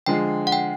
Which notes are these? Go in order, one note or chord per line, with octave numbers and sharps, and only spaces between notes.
D3 F3 G#3 G5
F#5
G5